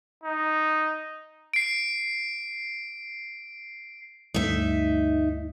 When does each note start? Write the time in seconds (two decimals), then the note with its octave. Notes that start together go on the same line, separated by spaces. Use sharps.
0.23 D#4
1.54 C7 D7
4.34 D2 G2 A3 D#4 E5